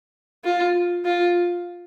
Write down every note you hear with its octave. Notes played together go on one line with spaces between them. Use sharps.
F4
F4